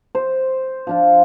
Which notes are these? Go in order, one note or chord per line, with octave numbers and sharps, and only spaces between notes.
C5
F3 D4 F4